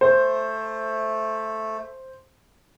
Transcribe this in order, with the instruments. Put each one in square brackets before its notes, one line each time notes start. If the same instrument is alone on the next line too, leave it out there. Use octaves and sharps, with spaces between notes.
[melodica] A3 [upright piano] C5